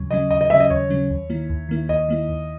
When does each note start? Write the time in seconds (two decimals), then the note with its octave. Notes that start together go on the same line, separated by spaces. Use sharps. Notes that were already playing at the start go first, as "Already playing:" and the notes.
Already playing: D#2 C#3 F#3 C#4
0.11 C#3 F#3 C#4 D#5
0.31 D#2 D#5
0.41 D#5
0.50 C#3 F#3 C#4 E5
0.60 D#5
0.70 D#2 C#5
0.90 C#3 F#3 C#4
1.10 D#2
1.30 D#3 A#3 E4
1.49 D#2
1.69 D#3 A#3 E4
1.89 D#2 D#5
2.09 D#3 A#3 E4
2.29 D#2